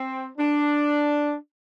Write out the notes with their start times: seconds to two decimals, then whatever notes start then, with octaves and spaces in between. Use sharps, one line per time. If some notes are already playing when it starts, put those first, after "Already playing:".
Already playing: C4
0.38 D4